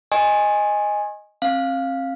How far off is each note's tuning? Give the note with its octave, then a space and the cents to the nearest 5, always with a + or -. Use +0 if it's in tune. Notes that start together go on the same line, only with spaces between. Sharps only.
D#5 +0 G#5 -5 C6 +45
C4 +40 F5 +0